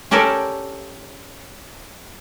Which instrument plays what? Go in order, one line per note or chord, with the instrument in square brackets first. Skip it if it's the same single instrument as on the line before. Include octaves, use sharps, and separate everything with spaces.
[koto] C#4 G4 A4 A#4 D5